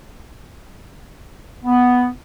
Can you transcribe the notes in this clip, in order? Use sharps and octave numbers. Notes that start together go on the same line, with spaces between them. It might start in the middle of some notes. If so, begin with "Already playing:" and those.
B3